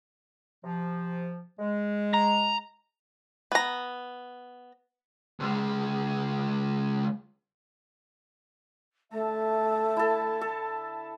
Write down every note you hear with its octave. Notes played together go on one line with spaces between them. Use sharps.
C3 F3
G#3
A#5
B3 A#5
C#2 G#3
D3 A3 E5 A5
E4 A4
A4